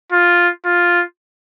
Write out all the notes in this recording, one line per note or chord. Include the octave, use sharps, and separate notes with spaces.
F4
F4